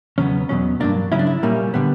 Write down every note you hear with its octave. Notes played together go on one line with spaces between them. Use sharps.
E2 C#3 F#3 B3 C#4
E2 B2 F#3 C#4
G2 F#3 A#3 D4
C#3 F#3 C#4 E4
D4
E4
A#2 G3 A#3 C#4
D3 G3 B3